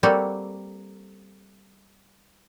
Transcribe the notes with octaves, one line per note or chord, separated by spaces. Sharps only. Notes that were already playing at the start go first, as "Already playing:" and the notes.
G3 A#3 C4 F#4 G4 A4